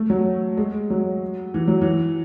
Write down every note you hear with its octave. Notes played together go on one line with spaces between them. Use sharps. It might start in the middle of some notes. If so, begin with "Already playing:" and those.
Already playing: A3
F#3
G#3
F#3
E3
F#3
E3